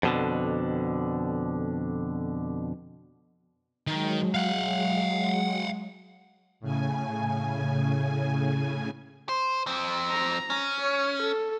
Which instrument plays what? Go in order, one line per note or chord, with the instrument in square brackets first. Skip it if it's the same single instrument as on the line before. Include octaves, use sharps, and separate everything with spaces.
[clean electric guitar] F2 B2 D3
[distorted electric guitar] D#3 [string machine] F#3 G#3
[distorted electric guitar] F5 F#5
[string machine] A2 C#3 G#5
[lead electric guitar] C5
F2 C4
[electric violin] A#5
[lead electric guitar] C#4
[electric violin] C#5
A4